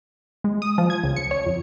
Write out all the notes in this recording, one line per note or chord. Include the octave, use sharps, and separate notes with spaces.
G#3
D#6
F3
G#6
C#2
C#7
C#5
F2